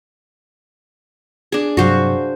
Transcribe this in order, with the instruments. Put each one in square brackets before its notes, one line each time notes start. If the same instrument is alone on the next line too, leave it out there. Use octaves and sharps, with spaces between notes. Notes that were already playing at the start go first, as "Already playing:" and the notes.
[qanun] D4 G#4
[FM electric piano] G2 C3 F#3 [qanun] F#4 C5 F5